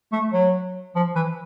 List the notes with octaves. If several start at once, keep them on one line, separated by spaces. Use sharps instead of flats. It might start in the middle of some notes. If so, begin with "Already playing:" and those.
A3
F#3
F3
E3